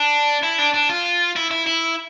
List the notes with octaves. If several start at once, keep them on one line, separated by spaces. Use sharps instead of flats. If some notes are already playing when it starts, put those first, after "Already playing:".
Already playing: D4
E4
D4
D4
F4
E4
E4
E4